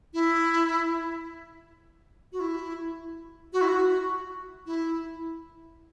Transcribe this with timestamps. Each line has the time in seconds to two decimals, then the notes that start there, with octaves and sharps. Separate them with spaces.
0.14 E4
2.32 F#4
2.40 E4
3.53 F#4
3.61 E4
3.68 F#4
4.66 E4